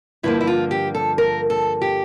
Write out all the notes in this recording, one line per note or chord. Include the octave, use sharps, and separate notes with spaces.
G2 D3 F3 A#3 E4
E4
F4
G4
A4
A#4
A4
G4